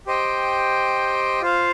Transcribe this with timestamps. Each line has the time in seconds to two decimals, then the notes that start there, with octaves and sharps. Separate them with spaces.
0.07 G4 C5 D#5 G5
1.41 F4 C5 F5